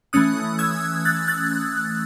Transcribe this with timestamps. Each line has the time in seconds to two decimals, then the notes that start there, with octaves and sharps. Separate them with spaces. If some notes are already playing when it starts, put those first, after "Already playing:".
0.13 E3 A3 C#4 D#6 F#6
0.59 E6 G#6
1.05 F#6 A6
1.28 F#6 A6